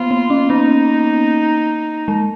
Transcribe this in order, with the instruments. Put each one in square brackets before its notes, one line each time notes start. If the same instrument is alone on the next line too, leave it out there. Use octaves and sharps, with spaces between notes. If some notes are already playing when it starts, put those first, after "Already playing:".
Already playing: [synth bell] A#3 B3 [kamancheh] F4
[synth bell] B3
C#4
[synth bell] A#3 [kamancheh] D#4
[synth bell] G#3